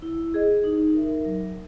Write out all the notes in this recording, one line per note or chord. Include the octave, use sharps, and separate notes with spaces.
E4
G#4 D#5
D#4
A#4 E5
F#3